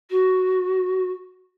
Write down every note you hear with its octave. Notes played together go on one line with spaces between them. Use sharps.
F#4